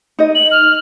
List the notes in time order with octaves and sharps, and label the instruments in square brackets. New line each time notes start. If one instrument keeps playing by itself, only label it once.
[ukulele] D#4 D#5
[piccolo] F#7
F6